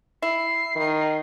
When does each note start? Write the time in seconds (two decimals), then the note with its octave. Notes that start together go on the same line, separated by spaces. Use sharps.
0.22 E4 C7
0.76 D#3